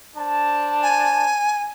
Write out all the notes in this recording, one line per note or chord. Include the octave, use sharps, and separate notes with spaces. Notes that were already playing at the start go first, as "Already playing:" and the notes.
D4 C5 A5
G#5